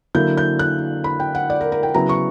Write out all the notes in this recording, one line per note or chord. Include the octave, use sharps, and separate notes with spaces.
D3 F#3 A#3 E4 G6
G6
F#6
B5
G5
F#5
D5
A#4
A#4
G5
C#3 F#3 B3 E4 A#5
C#6